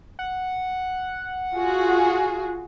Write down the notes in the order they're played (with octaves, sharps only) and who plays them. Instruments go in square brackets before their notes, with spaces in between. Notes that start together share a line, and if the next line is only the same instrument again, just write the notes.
[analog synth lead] F#5
[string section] F4 F#4 G#4